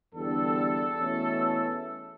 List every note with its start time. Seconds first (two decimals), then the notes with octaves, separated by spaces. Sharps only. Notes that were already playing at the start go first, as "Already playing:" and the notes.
0.14 E2 D3 G3 D4 A4
0.99 E2 B2 A3 C#4